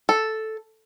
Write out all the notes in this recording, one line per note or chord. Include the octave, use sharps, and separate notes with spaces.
A4